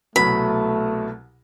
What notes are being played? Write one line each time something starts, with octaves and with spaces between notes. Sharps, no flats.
C2 B2 F#3 A3 B5